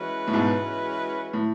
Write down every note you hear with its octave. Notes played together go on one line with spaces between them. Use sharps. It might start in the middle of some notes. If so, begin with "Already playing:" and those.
Already playing: E3 G#3 C#4 F#4 B4
A2
G#2 B2
A2